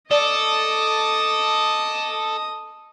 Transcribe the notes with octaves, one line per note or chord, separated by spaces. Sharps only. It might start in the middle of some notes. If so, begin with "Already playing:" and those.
A4 D5 D#5 A5 D6 D#6